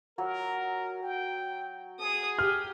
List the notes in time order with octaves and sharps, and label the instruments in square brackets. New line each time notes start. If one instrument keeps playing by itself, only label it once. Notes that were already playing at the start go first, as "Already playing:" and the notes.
[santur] F#3 [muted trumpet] A#4
[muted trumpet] G5
[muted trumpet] G#4 [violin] D#6
[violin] G4 [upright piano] F6